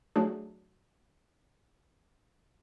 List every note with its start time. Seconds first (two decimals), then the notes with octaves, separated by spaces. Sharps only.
0.16 F#3 A3 D4 G#4